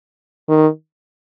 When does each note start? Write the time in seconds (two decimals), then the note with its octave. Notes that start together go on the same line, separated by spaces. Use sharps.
0.49 D#3